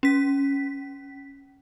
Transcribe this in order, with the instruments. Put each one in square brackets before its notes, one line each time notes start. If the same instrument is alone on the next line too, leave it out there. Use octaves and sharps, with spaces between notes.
[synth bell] C#4 B6